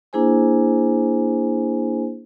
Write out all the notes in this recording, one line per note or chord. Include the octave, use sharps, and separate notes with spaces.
A#3 D4 E4 G#4 C5 G#5